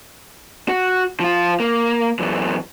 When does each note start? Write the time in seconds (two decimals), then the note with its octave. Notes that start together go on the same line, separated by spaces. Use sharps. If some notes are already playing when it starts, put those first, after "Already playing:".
0.68 F#4
1.20 F3 F4
1.60 A#3
2.19 F#2 E3